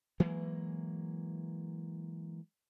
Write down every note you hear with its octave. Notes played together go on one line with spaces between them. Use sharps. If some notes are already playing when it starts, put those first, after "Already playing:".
E3 F#3 G#3 A#3